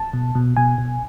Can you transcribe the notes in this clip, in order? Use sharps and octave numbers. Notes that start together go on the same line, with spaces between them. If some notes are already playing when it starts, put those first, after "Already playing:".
Already playing: A5
B2
B2
B2 G#5
B2